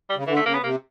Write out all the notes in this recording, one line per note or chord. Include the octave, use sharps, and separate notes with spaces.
G3
C#3
D3 E3
A3
C#3 A#3
B3
C3 A#3